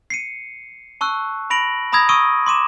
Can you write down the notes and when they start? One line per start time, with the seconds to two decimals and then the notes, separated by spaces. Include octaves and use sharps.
0.10 C7 C#7 D#7
1.01 A5 C#6 E6 F#6
1.50 B5 A#6 D7 F#7
1.92 A#5 B5 D#6 E6 G#6 A#6
2.09 C#6 D#6 E6 D7 D#7
2.46 C6 D6 D#7 E7